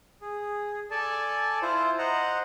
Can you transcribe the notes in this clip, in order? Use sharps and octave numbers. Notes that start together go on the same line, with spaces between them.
G#4
A4 D5 G#5 A5
E4 F4 C5
C5 D#5 F#5 A#5